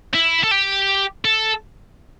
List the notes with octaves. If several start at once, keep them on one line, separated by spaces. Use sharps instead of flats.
E4
A4
G4
A4